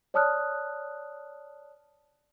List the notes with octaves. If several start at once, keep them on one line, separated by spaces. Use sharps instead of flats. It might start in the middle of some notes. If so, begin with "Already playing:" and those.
C#5 D5 A5 D#6 F6 F#6